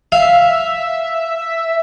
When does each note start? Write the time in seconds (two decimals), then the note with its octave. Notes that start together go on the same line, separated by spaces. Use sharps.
0.12 E5 F5